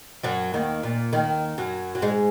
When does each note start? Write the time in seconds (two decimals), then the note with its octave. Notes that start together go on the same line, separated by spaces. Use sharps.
0.23 F#2 F#3
0.54 D#2 D#3
0.83 A#2
1.13 D#2 D#3
1.58 F#2 F#3
1.95 F#3
2.02 G#2 G#3